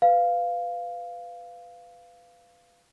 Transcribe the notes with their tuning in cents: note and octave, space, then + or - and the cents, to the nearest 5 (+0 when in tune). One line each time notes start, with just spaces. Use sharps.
B4 +15 F5 -5